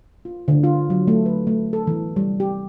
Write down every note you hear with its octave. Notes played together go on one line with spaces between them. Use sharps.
F4
D3
F4
F#3
A3
B4
A3
A4
E3
G3
G4